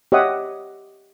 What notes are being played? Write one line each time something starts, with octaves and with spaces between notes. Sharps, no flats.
G4 C#5 D#5 E5 F#5 D#6